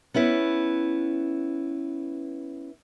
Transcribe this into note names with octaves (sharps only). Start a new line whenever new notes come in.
B3 C#4 E4 B4